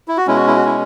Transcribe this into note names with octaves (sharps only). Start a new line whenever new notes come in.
E4
F#4
B2 G#3 C#4 E4
F#4
E4
F#4
E4